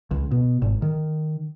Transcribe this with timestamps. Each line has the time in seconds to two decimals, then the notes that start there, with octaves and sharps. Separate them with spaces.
0.11 C#2
0.31 B2
0.62 G#1
0.82 D#3